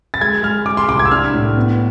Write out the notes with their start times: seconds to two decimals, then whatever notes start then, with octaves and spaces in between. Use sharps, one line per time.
0.14 A6
0.21 G#3 G#6
0.43 G#3 F6
0.66 G#3 D6
0.77 C6
0.88 C2 D6
0.99 G#6
1.05 E6
1.11 D4 F6
1.34 A2
1.57 B3